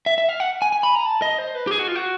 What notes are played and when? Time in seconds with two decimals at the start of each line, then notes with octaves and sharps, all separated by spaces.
0.06 E5
0.18 E5
0.29 F5
0.40 F#5
0.62 G#5
0.72 G#5
0.83 B5
0.95 A#5
1.06 A5
1.22 D#5
1.39 C5
1.55 B4
1.67 G4
1.71 G#4
1.79 F#4
1.88 F4
1.96 F#4